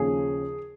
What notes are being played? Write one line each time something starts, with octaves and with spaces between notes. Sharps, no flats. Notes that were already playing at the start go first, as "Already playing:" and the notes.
Already playing: D#2 C#3 F3 G#4